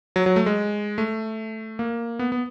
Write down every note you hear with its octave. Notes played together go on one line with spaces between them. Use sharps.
F#3
F#3
A3
G#3
A3
A#3
B3
B3